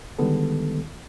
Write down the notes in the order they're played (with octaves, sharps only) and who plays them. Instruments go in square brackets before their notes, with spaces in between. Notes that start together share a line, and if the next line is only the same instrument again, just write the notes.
[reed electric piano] D3 D#3 G3 G#3 B3 A4